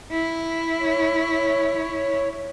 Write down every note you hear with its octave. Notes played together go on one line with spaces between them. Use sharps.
E4
C#5